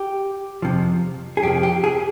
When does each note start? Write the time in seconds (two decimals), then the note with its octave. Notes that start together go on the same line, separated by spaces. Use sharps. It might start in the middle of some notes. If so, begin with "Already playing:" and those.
Already playing: G4
0.62 F2 C3 F3
1.37 G#4
1.43 F2 C3 F3 G4
1.63 G4
1.84 G#4